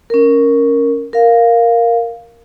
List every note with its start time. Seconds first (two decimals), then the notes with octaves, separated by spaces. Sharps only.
0.10 C#4 A#4
1.13 A#4 F5